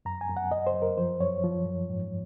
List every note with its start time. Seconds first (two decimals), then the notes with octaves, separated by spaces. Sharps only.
0.05 F#2 A#5
0.21 G#5
0.29 F#2
0.37 F#5
0.51 F#2 D#5
0.67 C5
0.74 F#2
0.82 A#4
0.97 F3 C5
1.20 F#2 C#5
1.44 F3
1.66 F#2
1.90 G#2